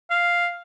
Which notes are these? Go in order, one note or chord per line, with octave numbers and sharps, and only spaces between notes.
F5